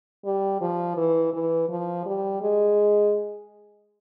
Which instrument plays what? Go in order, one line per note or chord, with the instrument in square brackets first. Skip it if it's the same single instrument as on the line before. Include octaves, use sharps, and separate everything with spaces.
[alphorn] G3
F3
E3
E3
F3
G3
G#3